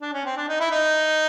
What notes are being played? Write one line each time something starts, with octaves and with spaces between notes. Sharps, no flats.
D4
C#4
C4
D4
D#4
E4
D#4